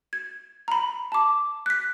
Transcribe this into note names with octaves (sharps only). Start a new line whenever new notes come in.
G#6
A#5 B5
A5 D6
F#6 B6